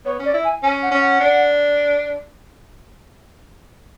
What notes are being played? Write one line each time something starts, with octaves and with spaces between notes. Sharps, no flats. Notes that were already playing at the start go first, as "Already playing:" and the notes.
B3 C#5
C#4
D5
E4
G#5
C#4 G#5
F#5
C#4
F#5
D4